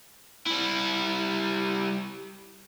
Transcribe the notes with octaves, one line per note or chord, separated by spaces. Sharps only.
G3 E4